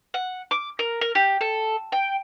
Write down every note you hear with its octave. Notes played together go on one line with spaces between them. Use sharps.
F#5
D6
A#4
A#4
G4
A4
G5